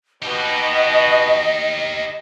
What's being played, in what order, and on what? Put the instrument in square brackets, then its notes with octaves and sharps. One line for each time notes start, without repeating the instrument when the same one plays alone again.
[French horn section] B2 [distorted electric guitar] D#4 G4 [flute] D#5